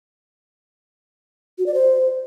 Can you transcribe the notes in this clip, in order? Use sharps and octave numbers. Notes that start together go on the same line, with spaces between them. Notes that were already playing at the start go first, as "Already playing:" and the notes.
F#4
D5
C5